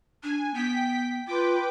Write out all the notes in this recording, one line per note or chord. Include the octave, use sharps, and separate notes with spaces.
D4 G#5
B3 G5 B6
F4 B4 G5 D6